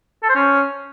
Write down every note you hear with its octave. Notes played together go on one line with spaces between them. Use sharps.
A4
C5
C#4